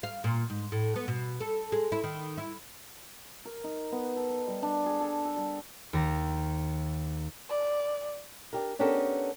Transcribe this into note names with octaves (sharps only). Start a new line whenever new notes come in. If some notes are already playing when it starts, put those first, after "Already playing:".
F5
A#2
G#2
A2
B3
B2
A4
G#3
E4
D#3
E4
A#4
D#4
B3
A4
A#5
G3
D4
G#4
A4
A4
G3
D#2 A#5
D5
D4 G4 A#4
B3 C#4 D4 G4 A4 A#4